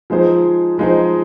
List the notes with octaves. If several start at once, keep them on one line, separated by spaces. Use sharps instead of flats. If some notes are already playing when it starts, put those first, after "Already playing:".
F3 G#3 D#4 G#4 C5
F3 G#3 D#4 G#4 C5